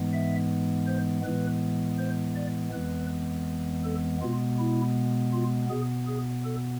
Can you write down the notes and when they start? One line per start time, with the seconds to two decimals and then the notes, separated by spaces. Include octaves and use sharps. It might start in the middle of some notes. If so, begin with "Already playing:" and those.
Already playing: G#2 E3 G#3 B3
0.13 E5
0.87 C5
1.24 A2 E3 G#3 B3 B4
1.99 C5
2.35 D5
2.73 F2 E3 G#3 B3 B4
3.84 A4
4.21 B2 G#3 B3 F4
4.59 E4
5.33 F4
5.69 B2 B3 G#4
6.07 G#4
6.45 A4